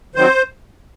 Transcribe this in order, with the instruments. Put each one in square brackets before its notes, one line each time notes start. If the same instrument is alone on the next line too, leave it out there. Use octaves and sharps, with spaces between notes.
[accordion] D#3 F#3 C4 C5